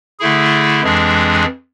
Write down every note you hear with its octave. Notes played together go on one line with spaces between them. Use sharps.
D3 A3 E4 G#4
F2 E3 G#3 D4 G#4